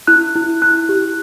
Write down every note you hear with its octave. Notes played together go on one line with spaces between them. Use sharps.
E4 F#6
E4
E4 F#6
G4